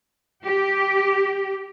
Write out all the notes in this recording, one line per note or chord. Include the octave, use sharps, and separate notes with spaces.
G4